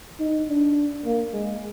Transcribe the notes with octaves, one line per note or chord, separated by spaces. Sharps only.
D#4
D4
A#3
G#3